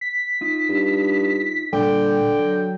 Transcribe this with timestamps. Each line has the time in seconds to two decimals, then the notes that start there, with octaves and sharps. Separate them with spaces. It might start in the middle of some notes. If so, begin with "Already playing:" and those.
0.01 B6
0.41 D#4 F4
0.69 G2
1.73 A#2 D3 G3 G5
2.39 F#3